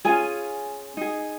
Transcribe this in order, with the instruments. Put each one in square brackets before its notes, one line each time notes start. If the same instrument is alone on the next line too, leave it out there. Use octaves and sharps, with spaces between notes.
[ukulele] C#4 F4 G#4 G#5
D#4 G#4